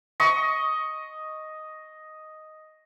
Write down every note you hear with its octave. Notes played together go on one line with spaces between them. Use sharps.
D#5 C#6